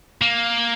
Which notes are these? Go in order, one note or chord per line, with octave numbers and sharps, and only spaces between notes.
A#3